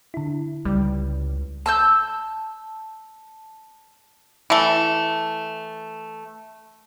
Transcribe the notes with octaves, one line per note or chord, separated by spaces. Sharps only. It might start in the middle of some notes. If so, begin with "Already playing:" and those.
D3 E4
C#2 G3
A5 E6 G6
E3 A3